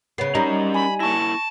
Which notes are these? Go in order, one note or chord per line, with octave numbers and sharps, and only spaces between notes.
C#3 B3 C#5 C7
G3 C#4 D#4 A#4 D#5 A#5
G#5 B5
A#3 E4 A5 C#6 A#6